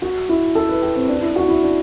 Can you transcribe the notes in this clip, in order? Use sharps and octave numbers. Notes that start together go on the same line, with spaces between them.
F#4
E4
A4
B4
G4
C4
D4
E4
F#4
E4
D4